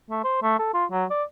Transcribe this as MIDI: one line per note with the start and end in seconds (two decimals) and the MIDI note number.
0.10 0.21 57
0.24 0.41 72
0.42 0.58 57
0.59 0.69 69
0.74 0.85 65
0.91 1.05 54
1.10 1.24 74